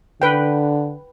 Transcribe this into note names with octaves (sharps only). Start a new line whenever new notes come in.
D3 B4 G5